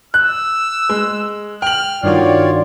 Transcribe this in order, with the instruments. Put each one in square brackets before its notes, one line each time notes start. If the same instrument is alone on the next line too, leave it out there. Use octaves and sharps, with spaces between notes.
[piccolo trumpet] E6 [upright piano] F#6
[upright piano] G#3
[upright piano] G5 F#7 [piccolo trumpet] F6
[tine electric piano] G2 D#3 F#4 [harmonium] F4 C#5 D5 [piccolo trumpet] F5